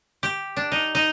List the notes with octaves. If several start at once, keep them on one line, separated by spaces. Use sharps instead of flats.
G4
D4
D#4
D#4